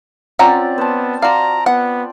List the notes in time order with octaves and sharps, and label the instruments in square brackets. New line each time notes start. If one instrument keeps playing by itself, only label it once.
[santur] C4 F4 D5 [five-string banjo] C#4 F#5 A#5
[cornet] B3 [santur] C5 A5
[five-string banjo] F#4 F5 [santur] D5 C6 [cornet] A#5
[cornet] B3 [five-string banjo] F#5